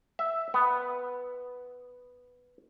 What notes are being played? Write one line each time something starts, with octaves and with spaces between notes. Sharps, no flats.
E5
B3